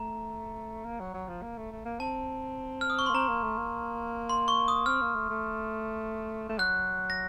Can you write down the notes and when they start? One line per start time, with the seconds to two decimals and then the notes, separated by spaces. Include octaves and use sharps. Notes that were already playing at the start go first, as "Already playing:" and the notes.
Already playing: A3 A#5
0.85 A#3
1.00 F#3
1.14 F#3
1.28 F3
1.42 A#3
1.57 A3
1.72 A3
1.85 A#3
2.00 C4 A5
2.81 F6
2.90 D#6
2.99 C#6
3.06 C6
3.10 A#3
3.14 C4 A#5
3.28 A#3
3.43 A3
3.58 A#3
4.29 C6
4.48 C#6
4.68 D#6
4.86 C4 F6
5.02 A#3
5.15 A3
5.30 A3
6.49 A3
6.58 F#3 F#6
7.10 A#6